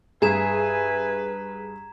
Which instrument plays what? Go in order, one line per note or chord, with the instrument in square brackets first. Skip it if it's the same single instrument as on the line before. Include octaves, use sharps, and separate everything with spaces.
[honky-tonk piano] G2 G#4 [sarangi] B4 [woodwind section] E5 G#5 [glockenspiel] A#5 G#6 E7